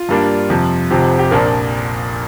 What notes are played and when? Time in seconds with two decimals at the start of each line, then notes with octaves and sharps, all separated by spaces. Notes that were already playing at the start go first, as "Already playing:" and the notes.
Already playing: F4
0.09 G2 G3 A#3 D4
0.50 F2 C3 F3
0.90 F1 F2 C3 F3 C4 G4
1.19 G4
1.31 A#1 A#2 F3 D4 A#4